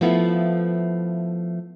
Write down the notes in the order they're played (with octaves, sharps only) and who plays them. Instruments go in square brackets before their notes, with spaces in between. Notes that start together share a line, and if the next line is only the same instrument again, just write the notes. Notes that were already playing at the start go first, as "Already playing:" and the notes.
[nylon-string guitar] F3 A3 B3 E4 F4